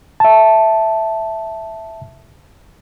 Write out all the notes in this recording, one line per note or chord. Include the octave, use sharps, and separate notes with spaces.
E5 A5